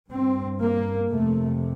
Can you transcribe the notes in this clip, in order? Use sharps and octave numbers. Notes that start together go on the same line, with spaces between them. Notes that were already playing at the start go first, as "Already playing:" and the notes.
G2 C4
A#3
F2 C3 A3